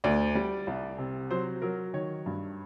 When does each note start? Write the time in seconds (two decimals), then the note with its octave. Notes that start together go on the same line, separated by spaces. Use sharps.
0.04 D2 D5
0.35 G3
0.67 C2
0.98 C3
1.31 F#3 C5
1.62 F#3 A#4
1.94 D#3 C#5
2.26 G2